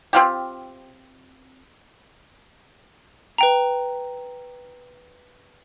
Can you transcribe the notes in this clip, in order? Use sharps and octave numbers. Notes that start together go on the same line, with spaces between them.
C4 F4 G4
B4 G5 A#5